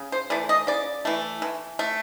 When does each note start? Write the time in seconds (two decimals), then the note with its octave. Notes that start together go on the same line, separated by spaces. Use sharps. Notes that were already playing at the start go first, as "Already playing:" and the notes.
Already playing: C#3
0.12 C5
0.30 E3 A3 D5
0.49 D#5
0.67 C#3 D5
1.05 E3 A3
1.42 E3
1.79 A3